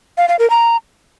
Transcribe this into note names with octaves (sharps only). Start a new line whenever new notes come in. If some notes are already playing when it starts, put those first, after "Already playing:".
F5
F5
A#4
A#5